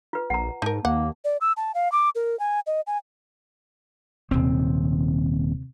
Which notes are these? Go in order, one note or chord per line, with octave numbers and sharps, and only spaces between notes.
F4 B4
A#1 F#5 A#5
G#2 D#4 A#4 A5
D#2 A#3 F#5
D5
E6
A5
F5
D6
A#4
G#5
D#5
G#5
D#1 D#2 C3 C4